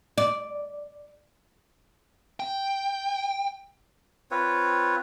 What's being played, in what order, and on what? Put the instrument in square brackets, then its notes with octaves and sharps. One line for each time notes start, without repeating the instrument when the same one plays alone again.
[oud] D5
[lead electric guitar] G5
[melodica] C4 F4 B4 C#5